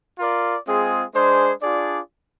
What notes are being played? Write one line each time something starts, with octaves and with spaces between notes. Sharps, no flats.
F4 A#4 D5
G#3 C4 F4 G#4
G#3 D4 G#4 C5
D4 F4 G#4 D5